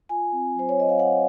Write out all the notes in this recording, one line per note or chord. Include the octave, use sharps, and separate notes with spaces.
F4 G#5
C4
F#3 C5
C#5
F#3 D#5
F5
F4 F#5